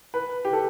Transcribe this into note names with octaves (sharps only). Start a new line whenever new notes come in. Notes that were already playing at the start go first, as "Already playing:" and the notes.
B4
G4
A4